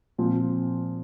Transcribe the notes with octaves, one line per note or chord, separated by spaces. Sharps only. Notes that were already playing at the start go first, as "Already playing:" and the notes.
A#2 F3 C4